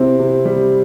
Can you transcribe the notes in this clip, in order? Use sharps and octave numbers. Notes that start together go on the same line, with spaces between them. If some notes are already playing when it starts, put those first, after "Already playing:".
Already playing: C3 C4 E4
C3
G3